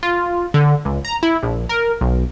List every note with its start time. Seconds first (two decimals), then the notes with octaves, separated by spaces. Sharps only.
0.03 F4
0.54 D3
0.85 C#2
1.05 A#5
1.23 E4
1.43 A#1
1.69 A#4
2.01 B1